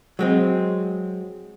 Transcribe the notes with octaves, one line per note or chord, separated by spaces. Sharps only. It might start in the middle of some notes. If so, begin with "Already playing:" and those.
F#3 G#3 C4